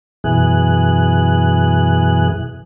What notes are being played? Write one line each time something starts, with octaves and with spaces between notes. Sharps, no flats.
F#2 B2 E3 G#4 F#6